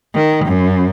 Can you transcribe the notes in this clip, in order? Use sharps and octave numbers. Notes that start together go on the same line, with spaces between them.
D#3
F#2